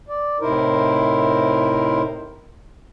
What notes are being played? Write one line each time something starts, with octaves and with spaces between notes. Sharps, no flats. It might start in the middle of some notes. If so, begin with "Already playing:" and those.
D5
A2 C3 D#4 E4 A#4 C5